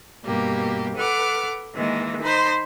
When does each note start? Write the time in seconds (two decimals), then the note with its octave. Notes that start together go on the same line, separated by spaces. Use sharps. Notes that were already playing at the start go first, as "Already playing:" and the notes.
0.25 G2 B2 A#3 G4
0.96 A4 B4 F#5 D6 F6
1.74 D#3 E3 G#3 A#3
2.22 D#4 C5 B5 C6